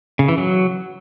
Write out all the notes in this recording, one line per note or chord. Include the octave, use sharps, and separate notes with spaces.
C#3
E3
F#3